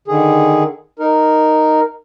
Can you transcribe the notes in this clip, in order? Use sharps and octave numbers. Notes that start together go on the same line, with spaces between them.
D3 D#3 G#4
D#4 A#4